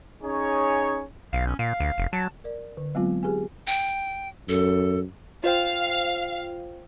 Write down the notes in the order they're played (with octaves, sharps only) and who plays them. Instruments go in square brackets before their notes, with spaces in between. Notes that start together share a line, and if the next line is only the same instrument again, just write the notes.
[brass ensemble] C#4 D#4 G#4 C#5
[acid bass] B1 [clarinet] F5
[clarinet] C#4
[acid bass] A#2 [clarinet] F5
[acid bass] D2
F1
[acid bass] F#3 [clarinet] A5
[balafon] A#4 D5
D3
F#3 G#3 B3 C4 F4
G4 G#4 B4 G#5
[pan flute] G5
[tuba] F#2 [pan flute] A4
[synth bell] F4 C5 G5 [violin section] F5